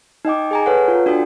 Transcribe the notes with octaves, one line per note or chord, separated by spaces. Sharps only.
D#4 D#5 G5 D6
G#4 G#5 A#5
A4 B4 C#5 F#5
F4
D4 F#4 A4 G5